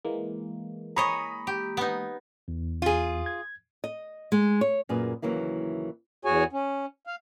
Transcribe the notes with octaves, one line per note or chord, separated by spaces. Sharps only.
E3 G#3 A#3
G#4 C#5 D#5 A#5 B5 D#6
G4
B3 D#4
E2
F4 G#4
G#6
D#5
G#3
C#5
F#2 A#2 G#4 B4
D#2 C#3 E3 F#3 A#3 E4
E2 F#4 G#4 C#5 G#5
C#4
F5